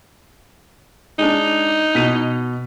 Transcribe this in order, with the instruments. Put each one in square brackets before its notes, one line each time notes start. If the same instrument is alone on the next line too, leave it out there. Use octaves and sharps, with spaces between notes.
[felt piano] G#3 D4 [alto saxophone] D#4
[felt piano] B2 B6 D#7